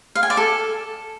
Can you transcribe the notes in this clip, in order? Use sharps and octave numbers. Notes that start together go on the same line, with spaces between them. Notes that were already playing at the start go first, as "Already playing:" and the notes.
F5
G#5
D5
A4